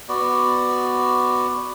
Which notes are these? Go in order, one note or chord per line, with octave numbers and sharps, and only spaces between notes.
B3 F#4 D5